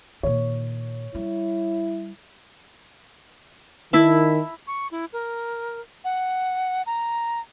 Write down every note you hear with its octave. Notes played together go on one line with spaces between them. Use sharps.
A#2 D#3 C#5
G3 E4
D#3 E4 E5 A5
C#6
E4
A#4
F#5
A#5